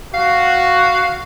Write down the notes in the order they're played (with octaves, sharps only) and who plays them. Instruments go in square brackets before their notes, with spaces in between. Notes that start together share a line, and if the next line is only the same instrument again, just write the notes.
[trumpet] F#4 [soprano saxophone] F5